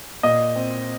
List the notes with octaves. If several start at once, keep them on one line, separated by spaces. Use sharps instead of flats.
A#2 D#5
C4